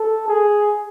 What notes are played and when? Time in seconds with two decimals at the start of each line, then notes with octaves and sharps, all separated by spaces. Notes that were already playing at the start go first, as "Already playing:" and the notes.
Already playing: A4
0.28 G#4